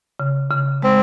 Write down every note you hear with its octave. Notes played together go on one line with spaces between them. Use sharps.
C#3
C#3
G#3 C4